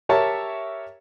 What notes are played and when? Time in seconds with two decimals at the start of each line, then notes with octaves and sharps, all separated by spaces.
0.09 G4 A#4 C#5 E5 A5